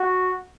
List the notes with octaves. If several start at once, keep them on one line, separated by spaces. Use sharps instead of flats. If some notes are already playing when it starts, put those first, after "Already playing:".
Already playing: F#4